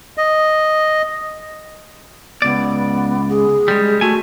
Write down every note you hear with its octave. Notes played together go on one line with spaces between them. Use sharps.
D#5
C#2 B3 D5
G#4
G3 G#3
A3 F#4 G#5